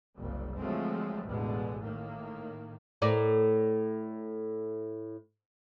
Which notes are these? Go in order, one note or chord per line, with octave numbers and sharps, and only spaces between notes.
F#1 C2 C#3
D3 F3 F#3 G#3 A3 C4
A1 E2 B2 D3 G#3
A2 D#3 A#3
A2 A#4 D5